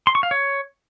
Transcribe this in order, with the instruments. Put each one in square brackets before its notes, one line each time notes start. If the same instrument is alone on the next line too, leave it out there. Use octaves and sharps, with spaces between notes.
[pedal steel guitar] C6
C#6
F5
C#5